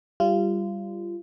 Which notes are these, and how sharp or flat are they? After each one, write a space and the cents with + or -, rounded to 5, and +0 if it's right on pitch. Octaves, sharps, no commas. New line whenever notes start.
G3 +0 F4 -25